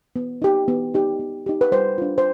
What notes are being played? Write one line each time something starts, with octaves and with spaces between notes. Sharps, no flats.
B3
D#4 G4
B3
D#4 G4
B3
D#4 G4
B4
G3 C5
D4 F4
C5